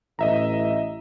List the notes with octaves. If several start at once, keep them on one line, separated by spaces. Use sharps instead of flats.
A1 D#5 E5 A#5